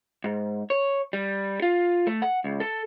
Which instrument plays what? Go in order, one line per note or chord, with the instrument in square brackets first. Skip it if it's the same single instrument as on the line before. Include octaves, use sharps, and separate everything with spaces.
[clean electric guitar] G#2
C#5
G3
F4
A3
F#5
C#2
A4